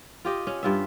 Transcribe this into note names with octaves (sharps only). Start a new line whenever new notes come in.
F4 G4 D#5
C#4
G2 F4 E5